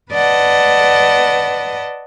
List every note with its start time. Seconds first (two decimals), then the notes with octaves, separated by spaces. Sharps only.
0.12 B4 D5 D#5 F#5 A5